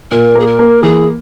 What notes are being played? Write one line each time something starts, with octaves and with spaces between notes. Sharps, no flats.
A#2 A#4
A#3 G#4
A#4
A#3
E3 G#4